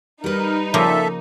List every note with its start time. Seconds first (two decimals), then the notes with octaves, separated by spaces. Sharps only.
0.24 G3 D#4 A#4 B4
0.74 A#2 C#3 F3 A#3 A4 E5